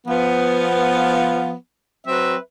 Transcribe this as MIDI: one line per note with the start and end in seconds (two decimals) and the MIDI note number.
0.06 1.51 53
0.06 1.51 59
2.07 2.35 54
2.07 2.35 60
2.07 2.35 71
2.07 2.35 72
2.07 2.35 76